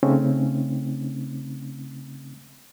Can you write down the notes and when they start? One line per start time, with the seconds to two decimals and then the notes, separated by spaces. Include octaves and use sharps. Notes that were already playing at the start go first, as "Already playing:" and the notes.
0.03 C#3 A3 C4 C#4 D#4